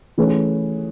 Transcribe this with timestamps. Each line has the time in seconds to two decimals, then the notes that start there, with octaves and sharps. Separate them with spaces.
0.18 E3 A3 C#4 G#4 B4